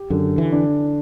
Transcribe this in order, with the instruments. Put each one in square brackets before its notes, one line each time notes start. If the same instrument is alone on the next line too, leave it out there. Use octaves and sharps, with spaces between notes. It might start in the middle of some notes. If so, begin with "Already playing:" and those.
Already playing: [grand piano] G4
[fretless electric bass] F#2 [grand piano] D3
[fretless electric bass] E3
[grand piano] D4